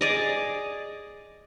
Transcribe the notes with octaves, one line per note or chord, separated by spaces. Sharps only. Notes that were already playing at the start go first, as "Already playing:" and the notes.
G#4 D5 D#5